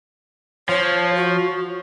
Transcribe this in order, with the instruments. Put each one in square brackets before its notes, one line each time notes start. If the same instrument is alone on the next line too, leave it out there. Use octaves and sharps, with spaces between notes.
[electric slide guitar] F3 [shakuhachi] C#5
[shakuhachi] F#4